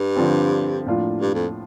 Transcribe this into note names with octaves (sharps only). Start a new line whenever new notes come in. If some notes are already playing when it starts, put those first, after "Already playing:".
Already playing: G2
D3 F3 C4 G4
A2 F3 A#3 D4 F4
G2
F2